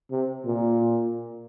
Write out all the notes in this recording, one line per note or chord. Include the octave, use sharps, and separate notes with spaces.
C3
A#2